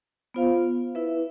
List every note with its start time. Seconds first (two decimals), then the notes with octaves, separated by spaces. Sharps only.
0.34 B3 F4 C5 F5
0.95 E4 B4 E5